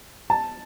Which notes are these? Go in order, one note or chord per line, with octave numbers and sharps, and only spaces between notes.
A5